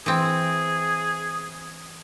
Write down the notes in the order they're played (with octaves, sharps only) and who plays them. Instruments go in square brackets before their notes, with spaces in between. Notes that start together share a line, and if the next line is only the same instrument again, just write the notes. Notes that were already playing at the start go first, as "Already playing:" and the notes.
[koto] E3 C4 [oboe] G#4